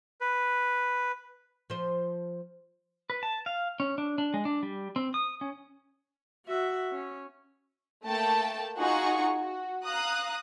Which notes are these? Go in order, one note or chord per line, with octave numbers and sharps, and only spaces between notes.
B4
F3 C5
B4
A5
F5
C#4
D4
D4
G#3
D4
G3
C4
D#6
C#4
F#4 E5
C#4
A3 A#3 G5 A5
D#4 F4 F#4 G#4 F#5 C#6
F#4
F5 A#5 D#6 F#6